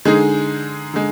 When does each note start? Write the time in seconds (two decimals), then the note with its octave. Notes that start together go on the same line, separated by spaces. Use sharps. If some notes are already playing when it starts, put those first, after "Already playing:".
0.05 D3 G#3 D#4 G#4
0.94 D3 G#3